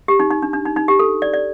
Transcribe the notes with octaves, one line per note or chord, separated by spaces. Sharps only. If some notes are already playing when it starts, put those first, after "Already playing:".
G4
D#4
D#4
D4
D4
D#4
D#4
G4
A4
D5
D5